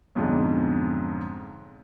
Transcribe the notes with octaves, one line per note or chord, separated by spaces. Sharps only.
B1 F2 G#2 D3 G#3